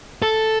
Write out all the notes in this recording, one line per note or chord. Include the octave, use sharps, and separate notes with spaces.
A4